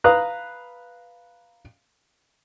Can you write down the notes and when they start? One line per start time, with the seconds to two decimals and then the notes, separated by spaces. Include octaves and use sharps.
0.04 B4 F5 A#5 D#6 F#6